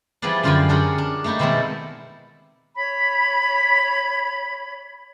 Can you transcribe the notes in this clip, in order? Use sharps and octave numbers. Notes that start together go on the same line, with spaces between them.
E3 F3 G3 G#4 B4 D5
F#2 D3 F4 C5 G5 G#5
C#4 D4 G#4 A#4 F#5 G5
D4
A3 A#3 D#4 E4 G4
B2 D#3 G#3 C4 E4 A4
C#5 B5